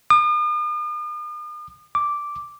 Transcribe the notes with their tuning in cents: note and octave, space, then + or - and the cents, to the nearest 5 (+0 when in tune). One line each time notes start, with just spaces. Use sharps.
D#6 -45
D6 -5